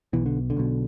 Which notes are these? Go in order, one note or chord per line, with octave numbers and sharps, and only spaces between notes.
B1 B2 E3
D3
D3
B1 B2